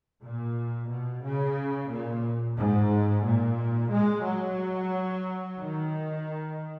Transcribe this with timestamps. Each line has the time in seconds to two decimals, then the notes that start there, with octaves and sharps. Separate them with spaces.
0.23 A#2
0.90 B2
1.24 C#3
1.91 A#2
2.57 G#2
3.24 A#2
3.91 G#3
4.25 F#3
5.59 D#3